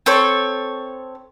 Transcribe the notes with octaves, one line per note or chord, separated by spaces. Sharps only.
C4 A4 C#5